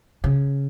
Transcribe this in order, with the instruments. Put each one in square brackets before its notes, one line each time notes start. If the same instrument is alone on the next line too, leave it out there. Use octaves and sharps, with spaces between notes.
[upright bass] C#3